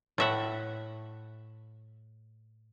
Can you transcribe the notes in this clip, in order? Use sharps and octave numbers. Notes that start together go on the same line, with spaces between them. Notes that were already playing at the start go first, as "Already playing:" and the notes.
A2 E5 F#5